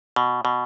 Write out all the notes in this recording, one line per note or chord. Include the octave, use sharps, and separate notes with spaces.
B2
B2